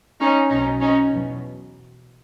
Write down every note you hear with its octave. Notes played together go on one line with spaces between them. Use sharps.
C#4 D#4
B1 B2 F#3 C#4 D#4
C#4 D#4
E2 B2 F#3